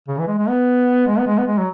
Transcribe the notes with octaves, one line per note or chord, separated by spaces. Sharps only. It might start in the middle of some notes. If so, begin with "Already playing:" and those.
C#3
E3
G#3
G#3
B3
G#3
B3
G#3
B3
G#3
F#3